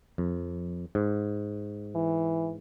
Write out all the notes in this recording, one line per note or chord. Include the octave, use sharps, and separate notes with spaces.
F2
G#2
E3